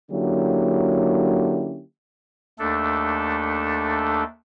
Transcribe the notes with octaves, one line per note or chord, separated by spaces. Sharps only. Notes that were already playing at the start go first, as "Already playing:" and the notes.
D3 F#3 A#3 C#4 E4 G4
D#2 A3 D4 A4